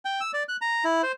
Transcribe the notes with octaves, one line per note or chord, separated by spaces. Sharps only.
G5
E6
D5
F#6
A#5
E4
C5